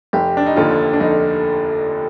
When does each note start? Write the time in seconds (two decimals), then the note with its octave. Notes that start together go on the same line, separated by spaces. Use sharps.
0.13 F1 G4
0.37 D4
0.46 D#4
0.56 D#2 D3 F3 F4
0.93 D4
1.00 F1 D#4